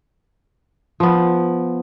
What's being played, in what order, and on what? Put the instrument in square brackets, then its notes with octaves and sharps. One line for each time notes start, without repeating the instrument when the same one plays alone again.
[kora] F3 B3